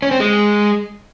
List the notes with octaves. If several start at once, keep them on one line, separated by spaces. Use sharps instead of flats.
C#4
C4
G#3